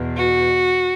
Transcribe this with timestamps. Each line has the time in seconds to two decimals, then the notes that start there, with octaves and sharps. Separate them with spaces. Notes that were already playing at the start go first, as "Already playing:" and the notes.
Already playing: E2 B2
0.17 F#4